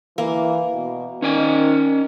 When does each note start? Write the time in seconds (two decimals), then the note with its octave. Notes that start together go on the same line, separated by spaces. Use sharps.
0.18 E3 A#3
0.73 B2
1.22 D#3 C#4 D5 G#5